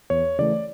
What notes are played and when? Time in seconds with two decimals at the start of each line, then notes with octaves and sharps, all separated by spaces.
0.10 E2 C#5
0.39 C#3 E3 A3 D5